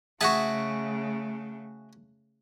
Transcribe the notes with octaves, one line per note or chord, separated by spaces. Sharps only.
C#3 A3 F#4 G#4 E5 F#5 A5